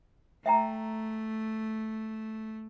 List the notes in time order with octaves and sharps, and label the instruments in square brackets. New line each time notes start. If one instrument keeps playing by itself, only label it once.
[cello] A3 [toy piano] E5 G5 A#5